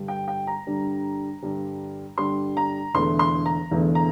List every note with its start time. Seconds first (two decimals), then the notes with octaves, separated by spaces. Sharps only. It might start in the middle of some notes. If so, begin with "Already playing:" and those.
Already playing: G2 D3 G3
0.08 G5
0.28 G5
0.47 A#5
0.66 G2 D3 G3
1.42 G2 D3 G3
2.18 G2 D3 G3 C6
2.57 A#5
2.94 E1 E2 D3 A3 C6
3.19 C6
3.46 A#5
3.71 E1 E2 D3 A3
3.95 A#5